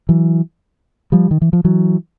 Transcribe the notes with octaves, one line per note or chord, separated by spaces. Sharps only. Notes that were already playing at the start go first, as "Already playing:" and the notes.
E3 F#3
F3 G3
D#3
E3
F3
E3 F#3